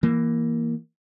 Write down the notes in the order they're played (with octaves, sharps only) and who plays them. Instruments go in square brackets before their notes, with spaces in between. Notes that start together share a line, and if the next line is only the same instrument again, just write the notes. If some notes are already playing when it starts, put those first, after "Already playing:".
[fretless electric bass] E3 A#3